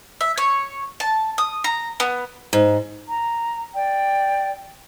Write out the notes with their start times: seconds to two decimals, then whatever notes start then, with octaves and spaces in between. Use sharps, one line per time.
0.21 E5
0.38 C#5
1.00 A5
1.38 D#6
1.64 A#5
2.00 B3
2.53 G#2
3.07 A#5
3.74 D5 G5